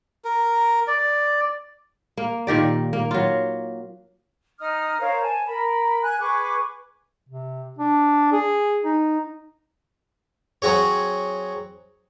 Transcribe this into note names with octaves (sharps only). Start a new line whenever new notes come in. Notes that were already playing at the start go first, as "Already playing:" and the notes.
A#4
D5
A#3
A#2 D#3 G4 D5
A#3
F#3 F4
D#4 D#6 F6
A#4 C5 C#5 F5
G#5 A5
A#4 B5
G#5 F#6
G#4 B4 C#6 D6
C3
D4
G#4
D#4
F#3 C4 F#4 G#4 C#5